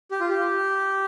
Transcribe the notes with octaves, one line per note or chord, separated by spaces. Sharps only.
G4
F4
G4